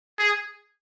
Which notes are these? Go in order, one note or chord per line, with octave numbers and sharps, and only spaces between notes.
G#4